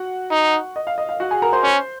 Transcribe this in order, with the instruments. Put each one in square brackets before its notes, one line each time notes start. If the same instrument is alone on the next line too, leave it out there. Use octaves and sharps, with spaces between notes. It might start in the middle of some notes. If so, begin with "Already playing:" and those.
Already playing: [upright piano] F#4 F#5
[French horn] D#4
[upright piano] D#5
F5
D#5
F5
F#4 F#5
G#4 G#5
A#4 A#5
C5 C6
[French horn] C#4